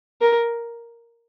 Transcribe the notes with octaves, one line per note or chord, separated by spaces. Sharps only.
A#4